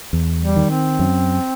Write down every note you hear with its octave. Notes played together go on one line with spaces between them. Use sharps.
E2
G3
D#3
C4
F#2